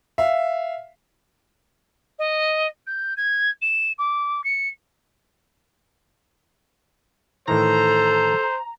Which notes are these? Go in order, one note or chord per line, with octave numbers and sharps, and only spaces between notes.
E5 F5
D#5
G6
G#6
E7
D6
C#7
A2 D#3 E3 A4 C5 A#5